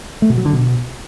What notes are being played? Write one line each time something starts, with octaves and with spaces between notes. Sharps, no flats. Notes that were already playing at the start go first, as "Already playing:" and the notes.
A3
B2
F#3
D3
B2